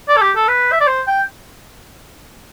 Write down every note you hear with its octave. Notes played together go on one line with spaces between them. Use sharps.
D5
A4
G4
A4
B4
E5
D5
C5
G5